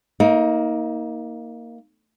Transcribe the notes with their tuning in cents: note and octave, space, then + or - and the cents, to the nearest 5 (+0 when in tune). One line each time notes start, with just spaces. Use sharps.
A#3 +0 D#4 +30